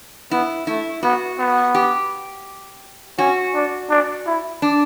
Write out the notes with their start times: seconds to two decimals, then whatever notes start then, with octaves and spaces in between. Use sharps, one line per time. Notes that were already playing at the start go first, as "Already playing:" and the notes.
0.31 B3 E4
0.67 A3 E4
1.03 B3 F#4
1.39 B3
1.75 G4
3.18 C#4 F#4
3.55 D4
3.90 D4
4.26 E4
4.62 D4